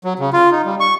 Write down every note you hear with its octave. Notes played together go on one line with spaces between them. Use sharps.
F#3
C#3
F4
D#4
G3
C#6